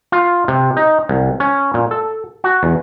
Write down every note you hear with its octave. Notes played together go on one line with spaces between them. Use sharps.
F4
C3
D#4
C2
C#4
A#2
A4
F#4
E2